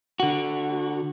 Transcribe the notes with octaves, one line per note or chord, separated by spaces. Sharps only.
D3 F#4